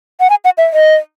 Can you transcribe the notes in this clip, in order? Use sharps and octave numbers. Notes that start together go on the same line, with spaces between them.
F#5
G#5
F#5
E5
D#5